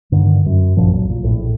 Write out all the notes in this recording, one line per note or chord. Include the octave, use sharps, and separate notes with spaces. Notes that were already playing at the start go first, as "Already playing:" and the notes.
G2 D3 D#3
F#2
G#1 F#2 A#2 F3
B1 F#3
B1 A#2
A#1 A2